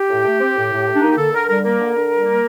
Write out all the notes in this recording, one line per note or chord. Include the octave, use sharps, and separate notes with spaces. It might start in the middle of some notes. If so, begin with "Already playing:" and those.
Already playing: G4
A2
A3
C4
A2
A2
A3
D4
A#3 D#4
G4
D3 A4
D3 A#4
G3 A#4
A#3 A#4
D3
D3
G3
A#3